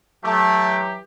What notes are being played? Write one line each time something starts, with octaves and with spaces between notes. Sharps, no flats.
E3 F#3 A3 G4